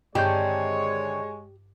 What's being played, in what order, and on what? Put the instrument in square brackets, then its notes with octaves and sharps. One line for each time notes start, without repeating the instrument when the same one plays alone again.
[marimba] G2 G6 [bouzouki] D3 D#3 C4 [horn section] G#3 C#5 [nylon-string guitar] G4